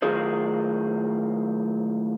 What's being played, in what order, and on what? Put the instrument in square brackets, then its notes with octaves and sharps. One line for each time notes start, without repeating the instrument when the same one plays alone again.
[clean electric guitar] A2 D#3 F#3 F4 G#4 C5